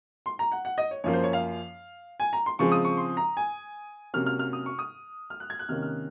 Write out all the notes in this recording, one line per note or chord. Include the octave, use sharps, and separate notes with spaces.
C6
A#5
F#5
F#5
D#5
C#5
F#2 F3 A#3 C#5
C5
C#5
F5
G#5
A#5
C6
C#3 F3 G#3 C4 C#6
D#6
C#6
C6
A#5
G#5
C3 F#3 A#3 C#4 F6
F6
F6
D#6
C#6
D#6
F6
F#6
G#6
F#6
C3 D#3 A#3 C#4 F6
F6